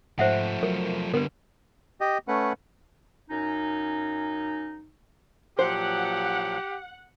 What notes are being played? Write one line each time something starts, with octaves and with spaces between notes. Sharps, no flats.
G#2 F3 A3 C5 E5 F#5
F#3 A#4
D3 G3 B3 A#4 B4
G4 D#5
A3 C#4 B4 F#5
F#2 C#4 D#4
A#2 F3 F#3 G4 C5 F#5